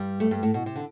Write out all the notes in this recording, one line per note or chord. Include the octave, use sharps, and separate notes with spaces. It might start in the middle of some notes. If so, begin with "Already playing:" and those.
Already playing: G2 G3
A3
G2 G3
A2 A3
B2
C3
D3